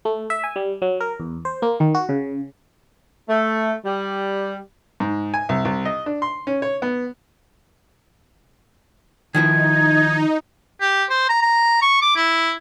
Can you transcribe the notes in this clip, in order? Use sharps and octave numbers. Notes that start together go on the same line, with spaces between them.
A3
E5
G#5
G3
F#3
A#4
E2
C5
A#3
D#3
F#4
C#3
A3
G3
G#2
G#5
C2
C2
D#5
D4
C6
C#4
C#5
B3
D#3 F3 D#4 E4 G#6
G4
C5
A#5
A#5
C#6
D6
E4